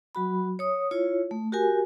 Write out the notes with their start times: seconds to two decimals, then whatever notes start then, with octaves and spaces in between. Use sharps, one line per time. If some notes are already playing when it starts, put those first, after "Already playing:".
0.15 F#3 F#4 B5
0.59 C#5 D#6
0.91 E4 F4 C#5
1.31 A3
1.52 F#4 G4 A#4 G#5